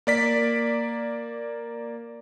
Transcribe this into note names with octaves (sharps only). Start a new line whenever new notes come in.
A#3 D5 B6